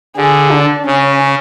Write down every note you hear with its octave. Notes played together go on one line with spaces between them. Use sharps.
D3 G#4
D4
C#3 C#4